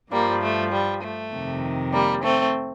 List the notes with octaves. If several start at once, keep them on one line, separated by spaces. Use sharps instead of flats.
G2 F3 G3 A#3
A3
G3
A3
F2 C3 D#3
G3 A#3
A3 C4